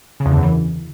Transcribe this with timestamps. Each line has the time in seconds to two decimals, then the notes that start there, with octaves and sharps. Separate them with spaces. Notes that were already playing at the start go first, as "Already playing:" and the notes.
0.20 C#3
0.26 E2
0.31 D3
0.37 F#2
0.43 E3